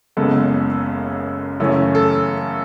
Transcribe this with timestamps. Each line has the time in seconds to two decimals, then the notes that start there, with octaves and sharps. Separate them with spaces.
0.17 F#1 F#2 C#3 G#3 B3 A4
1.60 F#2 C#3 E3 A3 C#4
1.95 A4